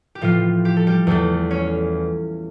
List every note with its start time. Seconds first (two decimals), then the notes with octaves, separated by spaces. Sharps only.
0.15 G4
0.21 A2 E3 F3 F4
0.65 G4
0.77 A4
0.87 G3 G4
1.07 E2 E3 A3 A4
1.51 C#4 C#5